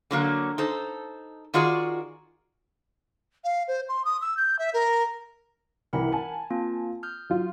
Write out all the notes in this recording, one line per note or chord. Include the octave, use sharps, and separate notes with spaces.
D3 F#3 A#3
D#4 A4 C5
D#3 F4 F#4 G#4 D5
F5
C5
C6
D#6
E6
G6
E5
A#4
C2 E3 A#4 F#5 A#5 B5
G#5 A5
A#3 C4 F4
D#6 F6 G6
F#3 F4